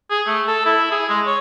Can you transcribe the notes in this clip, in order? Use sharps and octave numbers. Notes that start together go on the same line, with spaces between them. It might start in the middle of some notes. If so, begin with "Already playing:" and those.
G#4
A3
A4
E4
G#4
G#3
C#5